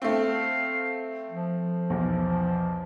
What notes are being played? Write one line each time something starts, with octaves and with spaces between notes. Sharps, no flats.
A3 C4 F5
F3
B1 E2